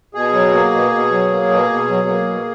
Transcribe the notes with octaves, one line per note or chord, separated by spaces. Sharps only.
B2 G#4
F#3
A#3
B2
B2
F#3
A#3
B2
B2
F#3
A#3
B2